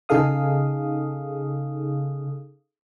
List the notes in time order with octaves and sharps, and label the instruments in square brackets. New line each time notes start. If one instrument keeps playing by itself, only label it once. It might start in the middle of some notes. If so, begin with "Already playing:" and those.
[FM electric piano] C#3 D#4 G#4 A4 F5 D#6